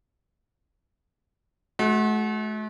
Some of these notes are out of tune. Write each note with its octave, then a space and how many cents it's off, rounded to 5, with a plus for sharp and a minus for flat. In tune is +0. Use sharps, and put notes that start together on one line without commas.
A3 -40 F#4 +0